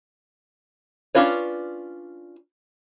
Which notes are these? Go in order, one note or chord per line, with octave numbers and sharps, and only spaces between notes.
C#4 D4 F4 B4 C#5